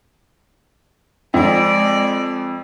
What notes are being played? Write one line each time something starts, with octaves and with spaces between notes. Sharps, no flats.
F2 G#3 D5